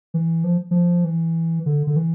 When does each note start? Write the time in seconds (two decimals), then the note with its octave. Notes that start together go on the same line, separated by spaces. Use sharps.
0.14 E3
0.44 F3
0.71 F3
1.04 E3
1.66 D3
1.87 D3
1.96 E3